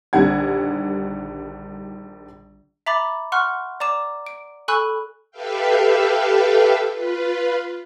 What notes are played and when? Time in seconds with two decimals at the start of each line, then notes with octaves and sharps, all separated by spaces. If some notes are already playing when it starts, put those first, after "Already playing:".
0.13 A#1 D3 D#3 G3 F#5 G#6
2.86 E5 A#5 B5 D6 A6
3.32 F#5 C6 C#6 F6 F#6
3.80 D5 A#5 D6 E7
4.27 D7
4.68 A4 G#5 B5 C#6 E6 F#6
5.31 G4 A4 B4 E5 F5 G5
6.91 F4 B4